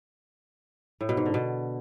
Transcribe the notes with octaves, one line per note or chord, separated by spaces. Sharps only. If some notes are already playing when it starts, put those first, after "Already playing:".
A2
B2
G#2
D3
B2